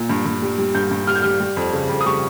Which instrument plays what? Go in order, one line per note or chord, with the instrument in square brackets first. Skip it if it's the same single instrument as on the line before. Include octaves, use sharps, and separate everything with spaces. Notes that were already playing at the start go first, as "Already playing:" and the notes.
Already playing: [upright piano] A#2
G2
G2
G3
G3
G2 G6
G2
G3 F6
G6
G3 F6
G3
F2
C#3
F2
D#6
G3 C#6